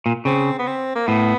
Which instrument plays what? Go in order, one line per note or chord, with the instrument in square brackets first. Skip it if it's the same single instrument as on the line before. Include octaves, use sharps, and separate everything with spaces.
[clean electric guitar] A#2
[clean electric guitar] C#3 [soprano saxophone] C4
[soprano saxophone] B3
C4
A#3
[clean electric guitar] A2 [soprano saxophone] B3